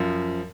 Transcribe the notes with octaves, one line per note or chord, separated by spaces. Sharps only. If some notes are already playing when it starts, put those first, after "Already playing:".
Already playing: F#2 F3